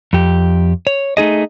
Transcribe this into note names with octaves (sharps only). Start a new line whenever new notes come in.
F2 G4
C#5
A3 D#4 G#4 D#5